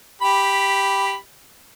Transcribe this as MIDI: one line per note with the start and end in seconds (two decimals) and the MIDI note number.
0.22 1.15 67
0.22 1.15 83